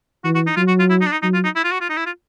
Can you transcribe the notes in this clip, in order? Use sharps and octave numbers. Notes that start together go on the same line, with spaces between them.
E3 F#4
F#4
D#4
F#3 F4
F#4
F4
E4
D#4
D4
D#4
F#3 D#4
F4
D#4
E4
F4
F#4
F4
D#4
E4
F4